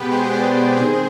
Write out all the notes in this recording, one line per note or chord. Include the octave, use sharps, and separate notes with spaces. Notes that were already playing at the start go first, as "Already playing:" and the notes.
Already playing: B2 G#3 B3 G4 B4
G#4 C5
C5
B4 D5
D#3 G#3 C4 G#4 C5